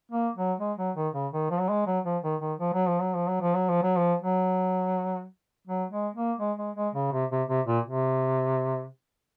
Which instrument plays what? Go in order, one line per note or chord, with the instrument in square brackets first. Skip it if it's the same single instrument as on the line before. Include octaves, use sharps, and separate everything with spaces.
[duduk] A#3
F#3
G#3
F#3
D#3
C#3
D#3
F3
F#3
G#3
F#3
F3
D#3
D#3
F3
F#3
F3
F#3
F3
F#3
F3
F#3
F3
F#3
F3
F#3
F#3
G#3
A#3
G#3
G#3
G#3
C#3
C3
C3
C3
A#2
C3